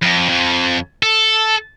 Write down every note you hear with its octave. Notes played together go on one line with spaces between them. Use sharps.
F2
F2
A4